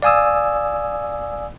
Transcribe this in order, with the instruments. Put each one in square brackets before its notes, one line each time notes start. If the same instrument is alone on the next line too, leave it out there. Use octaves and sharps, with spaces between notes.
[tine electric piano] D5 F5 G#5 D#6 E6